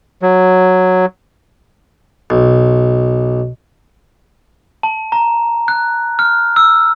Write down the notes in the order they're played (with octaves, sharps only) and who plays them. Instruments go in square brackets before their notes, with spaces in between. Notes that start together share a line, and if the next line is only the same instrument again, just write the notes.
[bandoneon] F#3
[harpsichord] B1
[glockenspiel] A5
A#5
F#6
F6
E6